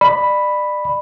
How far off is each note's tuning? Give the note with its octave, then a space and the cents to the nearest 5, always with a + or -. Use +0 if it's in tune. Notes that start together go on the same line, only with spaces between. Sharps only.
D5 +30 B5 +0